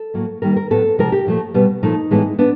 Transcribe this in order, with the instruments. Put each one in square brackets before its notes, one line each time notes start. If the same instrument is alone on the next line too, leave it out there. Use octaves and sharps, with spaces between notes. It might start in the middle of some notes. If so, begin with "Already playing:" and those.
Already playing: [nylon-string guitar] A4
A2 F#3 A#3
D#3 G3 A#3 A#4
A#4
A2 F#3 B3 A4
C3 F3 G#3 A#4
G4
A#2 F3 A3
B2 G3 B3
A#2 F3 A3 D#4
A2 E3 G#3 B3
B3 D4